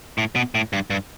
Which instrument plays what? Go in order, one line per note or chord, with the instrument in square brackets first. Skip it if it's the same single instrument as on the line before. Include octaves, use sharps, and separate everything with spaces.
[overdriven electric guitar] A2
B2
A2
G2
G2